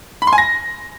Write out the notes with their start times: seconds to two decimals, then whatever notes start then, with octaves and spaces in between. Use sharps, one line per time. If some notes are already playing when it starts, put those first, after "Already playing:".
0.22 B5
0.27 C6
0.33 G#5
0.38 A#6